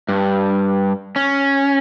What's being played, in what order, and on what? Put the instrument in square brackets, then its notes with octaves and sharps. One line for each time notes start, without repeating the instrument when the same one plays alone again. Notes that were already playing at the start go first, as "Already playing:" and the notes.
[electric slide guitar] G2
C#4